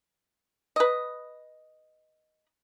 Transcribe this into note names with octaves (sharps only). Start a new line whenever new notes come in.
B4 D#5